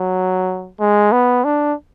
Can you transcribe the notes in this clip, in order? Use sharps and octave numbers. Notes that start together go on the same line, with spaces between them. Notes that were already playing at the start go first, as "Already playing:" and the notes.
Already playing: F#3
G#3
B3
D4